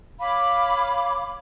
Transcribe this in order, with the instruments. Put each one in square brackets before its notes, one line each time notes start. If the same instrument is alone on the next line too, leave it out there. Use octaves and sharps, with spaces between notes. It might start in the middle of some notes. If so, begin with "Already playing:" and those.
[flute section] C#5 F5 B5 D6